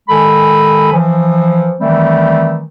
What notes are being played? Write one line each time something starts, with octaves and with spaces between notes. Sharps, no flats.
D#3 G#3 A4 G#5 B5
E3 F3
D#3 E3 G3 A3 C4